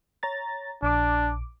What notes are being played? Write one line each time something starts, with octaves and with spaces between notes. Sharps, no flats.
C#5 A#5 A6
A#1 D4 D6